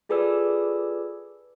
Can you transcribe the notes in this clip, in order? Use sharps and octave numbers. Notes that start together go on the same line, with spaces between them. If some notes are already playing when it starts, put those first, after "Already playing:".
F4 G#4 A4 B4 D5 E6